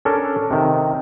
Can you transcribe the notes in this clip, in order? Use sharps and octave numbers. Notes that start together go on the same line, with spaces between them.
C#4 D4 A4 A#4
C3 D#3